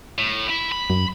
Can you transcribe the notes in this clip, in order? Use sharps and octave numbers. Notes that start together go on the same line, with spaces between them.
A2
E4 B5
B5
F#2